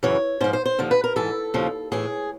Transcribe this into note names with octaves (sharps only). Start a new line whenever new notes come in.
F#2 C#3 E3 C#5
G#2 F3 C5
C5
C5
D#2 D3 F3
B4
A#4
G#2 E3 A4
D#2 C#3 F3
A2 E3 G#4